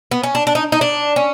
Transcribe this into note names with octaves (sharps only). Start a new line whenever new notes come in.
B3
C#4
D4
D4
D#4
D#4
D4
C#4